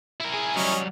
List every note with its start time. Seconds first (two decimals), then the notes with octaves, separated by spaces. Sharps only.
0.20 E4 A#4
0.34 G#4
0.56 F#3 G3 C#4 D#5